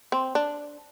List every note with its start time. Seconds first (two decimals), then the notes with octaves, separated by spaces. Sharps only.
0.12 C4
0.35 D4